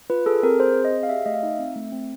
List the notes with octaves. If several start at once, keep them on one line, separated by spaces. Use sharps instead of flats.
F4 B4
G#4 A4
C4 A#4
G#4 C5
C4
D#5
G#4
F5
G4 E5
A3 D#5
F5
D#4 E5
C4
A3
C4